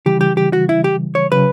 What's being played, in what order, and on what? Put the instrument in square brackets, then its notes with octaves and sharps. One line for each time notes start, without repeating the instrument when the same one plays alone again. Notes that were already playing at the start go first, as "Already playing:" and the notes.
[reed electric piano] C#3 E3 G3 [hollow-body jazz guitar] G4
[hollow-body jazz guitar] G4
G4
F#4
E4
G4
C#5
[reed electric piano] C#3 F#3 C#4 [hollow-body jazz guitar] B4